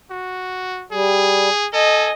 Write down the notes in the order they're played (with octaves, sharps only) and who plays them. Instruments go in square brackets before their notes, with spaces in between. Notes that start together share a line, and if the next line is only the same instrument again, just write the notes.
[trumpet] F#4
[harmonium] G3 [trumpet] G#4
[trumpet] A4 [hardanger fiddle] D#5 [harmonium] G#5